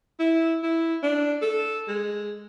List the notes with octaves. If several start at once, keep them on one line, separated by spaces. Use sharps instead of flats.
E4
E4
D4
A4
G#3